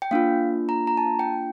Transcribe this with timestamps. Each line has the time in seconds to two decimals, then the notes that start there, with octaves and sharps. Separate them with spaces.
0.02 G5
0.11 A#3 D4 F4 F5
0.69 A#5
0.87 A#5
0.97 A5
1.19 G5